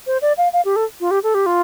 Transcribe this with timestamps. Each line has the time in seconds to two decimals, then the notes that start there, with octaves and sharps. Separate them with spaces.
0.07 C5
0.22 D5
0.38 F5
0.53 F5
0.65 G4
0.76 A4
1.00 F4
1.11 G4
1.23 A4
1.34 G4
1.46 F4